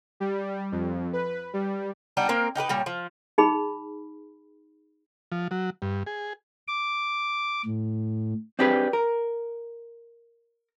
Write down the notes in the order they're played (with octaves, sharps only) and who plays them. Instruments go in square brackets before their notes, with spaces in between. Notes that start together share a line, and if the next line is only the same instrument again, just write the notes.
[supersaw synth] G3
F2
B4
G3
[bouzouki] G3 B3 D4 D#4
A#3 C4 A#4
D#4 G4 A#4 B4
A#2 G3 C#5
F3
[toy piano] D#4 G#4 B5
[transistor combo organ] F3
F#3
G2
G#4
[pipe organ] D6
A2
[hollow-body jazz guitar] C4 D4 G4 G#4 B4
A#4